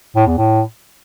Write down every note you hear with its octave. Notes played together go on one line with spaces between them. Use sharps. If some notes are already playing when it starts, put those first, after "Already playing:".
A2
E2
A2